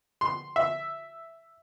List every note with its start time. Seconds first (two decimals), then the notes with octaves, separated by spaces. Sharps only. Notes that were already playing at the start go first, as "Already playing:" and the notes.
0.21 C6
0.56 E5